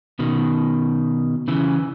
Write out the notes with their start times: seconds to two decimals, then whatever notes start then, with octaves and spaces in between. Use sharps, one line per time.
0.19 B2 D#3
1.48 C#3 E3